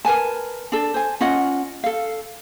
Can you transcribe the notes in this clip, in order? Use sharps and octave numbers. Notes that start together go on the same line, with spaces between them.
A#4 B4 G#5 A5
D4 A4
C5 G#5
C#4 F4 D#5 F#5
A4 F5